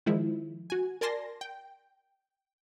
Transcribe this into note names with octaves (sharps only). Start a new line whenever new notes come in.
D#3 F3 G#3 E4
F#4 G#5
A#4 D5 G#5 A5 C6 A#6
G5